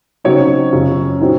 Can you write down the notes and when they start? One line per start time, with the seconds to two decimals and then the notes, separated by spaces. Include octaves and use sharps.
0.24 C#3 F#3 C4 D#4 C#5 C#6
0.73 F#2 C#3 F3
1.20 A#2 F#3 C4 D#4